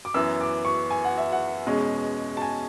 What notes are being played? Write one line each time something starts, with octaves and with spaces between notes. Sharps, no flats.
D6
F#2 E3 B3 E6
D6
C#6
G#5
F#5
E5
F#5
E2 B2 G#3 C#4
A5
G#5